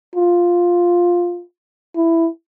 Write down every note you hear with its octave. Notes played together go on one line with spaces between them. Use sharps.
F4
E4